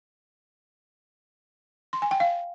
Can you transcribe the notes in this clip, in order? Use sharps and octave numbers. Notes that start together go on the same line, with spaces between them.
C6
G#5
G5
F5